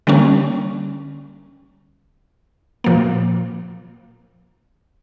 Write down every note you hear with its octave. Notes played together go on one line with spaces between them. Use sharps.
D3 G3 A#3 C#4
A#2 F3 A#3